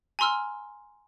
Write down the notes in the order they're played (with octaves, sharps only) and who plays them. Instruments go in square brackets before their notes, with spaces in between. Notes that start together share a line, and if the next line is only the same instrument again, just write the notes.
[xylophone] G#5 A#5 C6 E6 F6